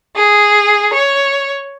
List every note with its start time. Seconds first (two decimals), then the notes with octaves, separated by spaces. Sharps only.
0.16 G#4
0.94 C#5